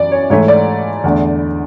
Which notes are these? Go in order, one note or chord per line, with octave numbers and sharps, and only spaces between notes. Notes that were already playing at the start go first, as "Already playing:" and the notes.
Already playing: F#2 E3 D5
C#5
G#2 E3 A3 C#5
D5
E2 D3 A3